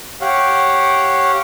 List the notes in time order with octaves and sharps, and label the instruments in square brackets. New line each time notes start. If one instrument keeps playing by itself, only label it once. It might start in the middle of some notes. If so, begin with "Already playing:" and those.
[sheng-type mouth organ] G4 C#5 F5 F#5